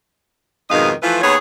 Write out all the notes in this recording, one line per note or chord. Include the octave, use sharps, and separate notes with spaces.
F2 G#2 B2 D#3 D#5 F5
E3 F3 A3 F4 B4
D#2 B3 G#4 C#5